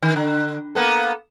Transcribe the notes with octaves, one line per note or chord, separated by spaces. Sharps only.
D#3
D3
A#3 B3 A4